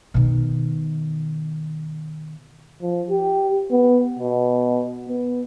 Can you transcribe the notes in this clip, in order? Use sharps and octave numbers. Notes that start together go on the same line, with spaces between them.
B2 D#3
F3
G4
B3
B2
B3